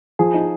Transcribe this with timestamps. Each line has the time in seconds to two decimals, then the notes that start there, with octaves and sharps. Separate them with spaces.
0.19 F3 G#4
0.34 D#4